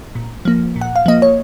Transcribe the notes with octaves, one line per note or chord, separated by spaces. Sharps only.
A#2
F3 A#3
A#2
F#5
F5
F3 A#3 D#5
C#5